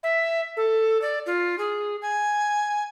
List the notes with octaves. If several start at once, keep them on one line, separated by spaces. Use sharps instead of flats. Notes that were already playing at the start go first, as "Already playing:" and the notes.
E5
A4
D5
F4
G#4
G#5